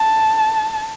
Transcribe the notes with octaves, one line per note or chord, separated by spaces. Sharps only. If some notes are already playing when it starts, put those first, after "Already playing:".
Already playing: A5